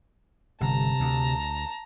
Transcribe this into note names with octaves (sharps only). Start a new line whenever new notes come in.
G1 C3 A5 A#5
D2